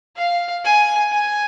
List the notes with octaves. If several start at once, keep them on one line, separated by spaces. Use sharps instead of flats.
F5
G#5
G#5